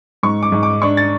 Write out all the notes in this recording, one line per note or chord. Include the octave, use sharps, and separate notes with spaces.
G#2 C#6
D6
G#2
D6
D4 C#6
A6